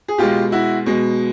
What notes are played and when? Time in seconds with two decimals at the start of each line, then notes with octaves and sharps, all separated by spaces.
0.08 G#4
0.18 B2 G#3 F4 G4
0.52 E4 F#4
0.86 B2 G#3